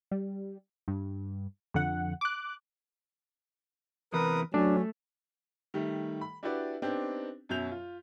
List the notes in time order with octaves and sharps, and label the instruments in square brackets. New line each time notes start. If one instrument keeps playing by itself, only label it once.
[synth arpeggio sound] G3
G2
F2 D3 F#5
D6 F#6
[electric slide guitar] E2 C3 E3 [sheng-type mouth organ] A#4 B4 D#6
[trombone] F#3 [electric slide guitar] A3 [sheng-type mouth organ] C#4 [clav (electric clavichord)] D4
[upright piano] D#3 G3 A3
B5
D4 E4 F#4 G4 B4 D5
B3 C4 D4 D#4 G4
F#2 B2 F#3 E5 G6 F7
F4